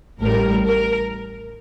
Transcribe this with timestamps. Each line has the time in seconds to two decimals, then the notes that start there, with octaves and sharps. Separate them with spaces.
0.21 A1 A2 G3 A#4
0.65 A#4